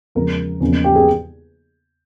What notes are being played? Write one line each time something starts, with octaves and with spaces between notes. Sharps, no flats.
E2 C#3 F3 G#3 A#4
E2 C#3 F3 A#3 C#4
G4
G#4